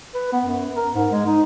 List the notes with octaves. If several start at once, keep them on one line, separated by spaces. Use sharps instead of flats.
B4
B3
F#2
A#4
G#2
G#3
D#4